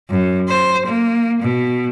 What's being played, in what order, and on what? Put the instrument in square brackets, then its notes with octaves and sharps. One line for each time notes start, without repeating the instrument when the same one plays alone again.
[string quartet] F#2
C5
A#3
B2